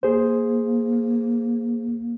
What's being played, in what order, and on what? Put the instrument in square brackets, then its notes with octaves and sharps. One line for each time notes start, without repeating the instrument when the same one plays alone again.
[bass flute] A#3 [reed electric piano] G#4 C5